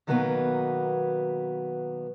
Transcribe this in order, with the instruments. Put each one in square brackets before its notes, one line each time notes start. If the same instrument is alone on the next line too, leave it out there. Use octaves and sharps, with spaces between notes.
[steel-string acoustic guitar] B2 D#3 F#3 A#3 B3 B4